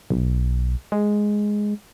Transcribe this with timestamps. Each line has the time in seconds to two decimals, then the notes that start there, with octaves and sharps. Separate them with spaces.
0.10 B1
0.92 G#3